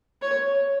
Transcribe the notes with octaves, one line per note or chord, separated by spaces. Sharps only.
C#5